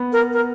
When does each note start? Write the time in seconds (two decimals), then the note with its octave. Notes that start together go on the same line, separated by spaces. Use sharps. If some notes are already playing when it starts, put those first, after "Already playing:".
Already playing: B3
0.12 A#4
0.33 A#4